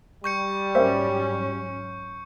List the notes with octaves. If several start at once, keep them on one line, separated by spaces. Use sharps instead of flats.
G3 C#6 G6 C#7
G#2 F#3 A#3 C#4 C5 E5